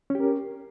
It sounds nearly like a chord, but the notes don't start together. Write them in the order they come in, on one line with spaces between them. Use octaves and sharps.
C#4 G4 A#4